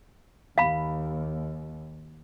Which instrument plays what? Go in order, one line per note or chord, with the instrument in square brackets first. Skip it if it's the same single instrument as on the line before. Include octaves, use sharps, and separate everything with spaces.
[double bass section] D#2 [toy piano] F5 B5